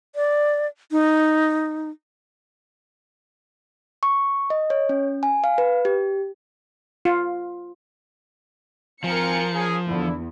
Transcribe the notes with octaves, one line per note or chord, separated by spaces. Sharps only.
D5
D#4
C#6
D#5
C#5
C#4
G#5
F5
B4
G4
F4
G#1 F3 C4 A#4 F5 G#5 C#7
C#4 G#4
E2 D3 E4